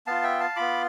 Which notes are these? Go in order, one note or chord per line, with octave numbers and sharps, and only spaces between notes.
B3 F4 F5 A5
E5 G5
F5 A5
B3 F4 B5 D6